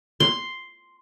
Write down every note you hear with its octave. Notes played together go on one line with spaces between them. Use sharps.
C6